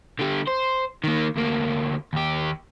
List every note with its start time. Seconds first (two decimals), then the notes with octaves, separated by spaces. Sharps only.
0.19 D3 G4
0.47 C5
1.04 D#3 A#3
1.36 D2 A#3
2.13 D#2 G4